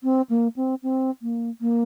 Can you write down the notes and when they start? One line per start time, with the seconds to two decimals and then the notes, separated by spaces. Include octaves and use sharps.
0.03 C4
0.30 A#3
0.56 C4
0.83 C4
1.22 A#3
1.61 A#3